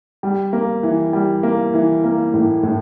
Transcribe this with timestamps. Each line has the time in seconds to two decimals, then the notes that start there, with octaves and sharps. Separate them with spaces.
0.23 G3
0.53 A#3
0.83 E3
1.13 G3
1.43 A#3
1.74 E3
2.04 A#3
2.34 A2
2.63 A2